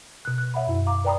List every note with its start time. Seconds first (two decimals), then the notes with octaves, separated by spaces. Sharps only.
0.25 B2 F#6
0.38 F#6
0.54 C#5 E5 F#5 B5
0.67 F#2 E4
0.86 F5 A#5 D6
1.05 B4 D5 G5 A#5 B5 D#6